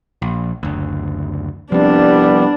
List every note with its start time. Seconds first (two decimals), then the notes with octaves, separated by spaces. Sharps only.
0.22 A#1
0.63 F#1 D2
1.72 C2 F3 G3 B3 C4 D4